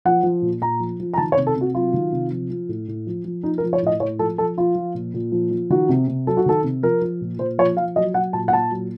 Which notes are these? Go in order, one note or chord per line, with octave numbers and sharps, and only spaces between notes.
F3 F#5
F3
A#2
A#2 A#5
F3
F3
A#5
D#3 A5
C#5
C3
A4
C3 F#4
F#3 F4
D#3
C3
F3
F3
A2
A2
F3
F3
F3 D#4
A#4
F3
C#5
A2 D#5
A2 C#5
F3 A4
F3 A4
F3 F4
F3
A#2
A#2
F3
F3
D#3 F#4
C3
C3
F#3 A4
F#4
D#3 A4
C3
F3 A#4
F3
A#2
A#2 C5
F3 C#5
F3 F5
F#3 D#5
F#3 F#5
A#2 A5
F#5
A#2 A5
F#3